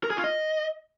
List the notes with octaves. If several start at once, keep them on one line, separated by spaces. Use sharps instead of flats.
A#4
G#4
F4
D#5